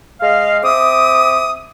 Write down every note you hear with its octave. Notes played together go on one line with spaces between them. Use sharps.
G#3 D#5 F5
C4 E5 D6 D#6